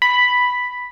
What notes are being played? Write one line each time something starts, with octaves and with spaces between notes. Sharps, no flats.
B5